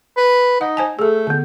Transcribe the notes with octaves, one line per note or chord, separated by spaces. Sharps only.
B4
D#4 F#5
C5 G#5 A5
A3 G#4 A4
D3 B3